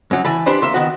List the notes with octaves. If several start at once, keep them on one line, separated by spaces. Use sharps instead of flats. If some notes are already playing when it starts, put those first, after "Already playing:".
F#2 F#3
E3 A5 B5
D4 G4 B4 C5 B5
A#3 E5 C6
D#3 B3 F#4